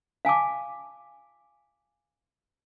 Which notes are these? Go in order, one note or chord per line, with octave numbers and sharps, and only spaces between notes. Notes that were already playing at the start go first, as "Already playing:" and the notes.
F5 G#5 A5 D6